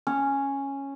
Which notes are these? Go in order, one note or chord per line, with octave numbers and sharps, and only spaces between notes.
C#4